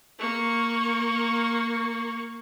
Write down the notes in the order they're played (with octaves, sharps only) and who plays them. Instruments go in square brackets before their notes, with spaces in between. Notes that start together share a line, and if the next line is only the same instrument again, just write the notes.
[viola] A#3 C#6